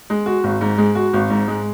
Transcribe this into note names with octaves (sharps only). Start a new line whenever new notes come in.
G#3
F#4
G#1
G#2
G#3
F#4
G#1
G#2
G#3